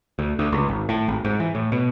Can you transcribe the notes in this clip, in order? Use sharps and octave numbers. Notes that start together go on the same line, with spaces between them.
D2
D2
C#2
G#1
A2
G#1
G#2
E3
A2
B2